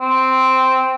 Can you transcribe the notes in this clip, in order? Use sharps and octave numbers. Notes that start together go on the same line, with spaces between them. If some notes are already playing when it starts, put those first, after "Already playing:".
C4